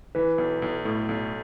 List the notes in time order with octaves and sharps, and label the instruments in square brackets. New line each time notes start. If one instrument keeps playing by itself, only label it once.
[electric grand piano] E3 [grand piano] B4
[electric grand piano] B1
B1
A2
B1